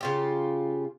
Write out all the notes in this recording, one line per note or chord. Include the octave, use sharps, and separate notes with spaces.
C#3 F4 G4